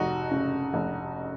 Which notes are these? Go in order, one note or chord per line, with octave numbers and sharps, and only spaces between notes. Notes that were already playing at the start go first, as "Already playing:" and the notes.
Already playing: F1 D#4 F#4
C#3
F1